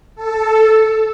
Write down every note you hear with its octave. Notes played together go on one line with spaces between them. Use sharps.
A4